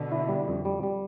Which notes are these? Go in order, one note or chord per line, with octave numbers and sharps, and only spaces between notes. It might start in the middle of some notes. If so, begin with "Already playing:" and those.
Already playing: B2 D3
E4
G3
F2
G3
G3